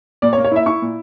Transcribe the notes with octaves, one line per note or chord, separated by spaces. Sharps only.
A#2 D5
C#5
A#3
C#5
E4 E5
E4 C#6
A#2